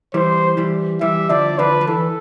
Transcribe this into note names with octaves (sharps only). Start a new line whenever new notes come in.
E3 G3 C5
E3 G3
E3 G3 E5
D3 F3 D5
D3 F3 B4
F3
E3 A4